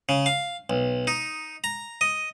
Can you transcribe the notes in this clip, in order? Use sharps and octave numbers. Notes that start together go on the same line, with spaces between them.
C#3
F5
B1
D#4
A#5
D#5